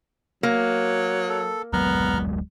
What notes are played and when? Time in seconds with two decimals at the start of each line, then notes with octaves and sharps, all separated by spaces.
0.43 F#3 A#3
1.29 A4
1.73 D1 F#3 G#3 B3 A#5 F6